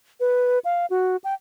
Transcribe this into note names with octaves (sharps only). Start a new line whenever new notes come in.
B4
F5
F#4
G5